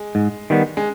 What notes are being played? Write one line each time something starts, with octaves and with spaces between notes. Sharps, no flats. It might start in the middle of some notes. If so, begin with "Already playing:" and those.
Already playing: G#3
G#2
D#3 G3 B3
G#3